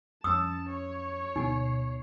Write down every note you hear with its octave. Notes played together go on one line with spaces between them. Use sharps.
F2 C#4 A5 D#6 E6
C#5
D2 B2 D#4 C7